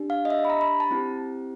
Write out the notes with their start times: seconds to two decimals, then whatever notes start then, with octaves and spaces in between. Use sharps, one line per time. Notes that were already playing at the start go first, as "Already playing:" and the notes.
Already playing: D4 G4
0.10 F5
0.25 D#5
0.30 E5
0.45 B5
0.50 A#5
0.61 B5
0.80 A5
0.91 C4 E4 G4